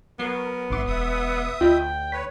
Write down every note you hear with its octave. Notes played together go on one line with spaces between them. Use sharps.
F#3 B3 A#4 F#6 C7
G#1 E5 F#5 C6 D6
E1 E5 D#6
D2 F4 D#5 G5 B5
B4 C#5 B6